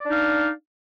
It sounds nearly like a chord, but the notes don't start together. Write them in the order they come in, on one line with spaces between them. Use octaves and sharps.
D5 D4 D#4 F5